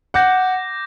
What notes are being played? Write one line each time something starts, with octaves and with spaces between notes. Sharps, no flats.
F#5 D6 G6 A#6